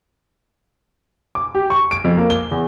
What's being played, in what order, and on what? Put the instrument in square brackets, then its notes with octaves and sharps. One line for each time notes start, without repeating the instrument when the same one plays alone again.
[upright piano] D6
G4
C#6
D7
F2
A#3
G7
E2